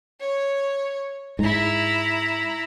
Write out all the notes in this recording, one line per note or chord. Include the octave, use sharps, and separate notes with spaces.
C#5
G#2 E4 A#5